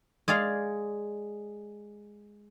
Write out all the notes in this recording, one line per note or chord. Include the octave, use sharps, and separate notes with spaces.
G#3 G#4 D5 F5